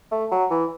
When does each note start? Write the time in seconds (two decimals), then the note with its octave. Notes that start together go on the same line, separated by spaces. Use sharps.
0.11 A3
0.31 F#3
0.51 E3